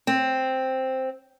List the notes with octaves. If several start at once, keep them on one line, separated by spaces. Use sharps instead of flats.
C4